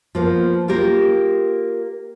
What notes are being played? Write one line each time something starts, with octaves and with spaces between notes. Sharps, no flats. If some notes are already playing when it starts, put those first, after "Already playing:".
F3 A#3 B3
A#3 F4 G4 A#4